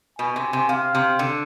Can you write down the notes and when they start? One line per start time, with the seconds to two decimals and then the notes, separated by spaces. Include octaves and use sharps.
0.19 B2 G#5
0.36 C3
0.53 C3
0.69 C3 F5
0.95 C3
1.19 D3